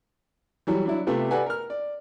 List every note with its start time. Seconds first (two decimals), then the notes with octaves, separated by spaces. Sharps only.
0.67 E3 F#3 G3
0.86 F#3 D4 E4
1.07 C3 A3 B3 F4 G4
1.31 G4 A4 B4 D5 F#5 G#5
1.46 A#4 F6
1.70 D5